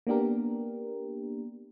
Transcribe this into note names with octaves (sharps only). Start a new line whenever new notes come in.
A#3 B3 D4 G4 A#4